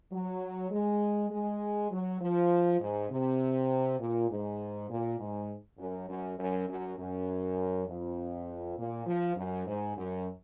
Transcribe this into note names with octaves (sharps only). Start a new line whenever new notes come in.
F#3
G#3
G#3
F#3
F3
G#2
C3
A#2
G#2
A#2
G#2
F#2
F#2
F#2
F#2
F#2
F2
A#2
F3
F#2
G#2
F#2